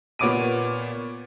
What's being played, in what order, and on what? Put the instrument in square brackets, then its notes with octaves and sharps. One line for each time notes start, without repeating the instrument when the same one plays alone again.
[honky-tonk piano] A#2 B3 C#5 D6 D7 D#7